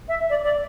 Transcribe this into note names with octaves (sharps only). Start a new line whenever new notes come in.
E5
D5
D5